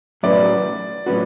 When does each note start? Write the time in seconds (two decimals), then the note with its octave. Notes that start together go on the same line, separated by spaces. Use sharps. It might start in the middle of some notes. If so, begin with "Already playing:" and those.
0.23 A2 F#3 C#4 F#4 B4 D5
1.06 A2 F#3 C#4 F#4 B4